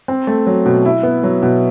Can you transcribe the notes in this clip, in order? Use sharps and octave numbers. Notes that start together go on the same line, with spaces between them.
C4
A3
F#3
B2
E4
B3
F#3
B2